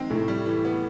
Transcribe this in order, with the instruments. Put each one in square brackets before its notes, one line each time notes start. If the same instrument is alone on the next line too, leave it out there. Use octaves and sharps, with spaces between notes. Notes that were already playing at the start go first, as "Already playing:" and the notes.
Already playing: [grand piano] D#3 G#3 C4
[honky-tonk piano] A2 [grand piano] C3
[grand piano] G3
E3
B3